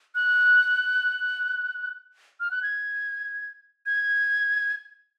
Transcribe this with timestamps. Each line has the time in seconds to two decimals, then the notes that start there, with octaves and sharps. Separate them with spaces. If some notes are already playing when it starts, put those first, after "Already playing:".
0.15 F#6
2.40 F6
2.51 F#6
2.63 G#6
3.86 G#6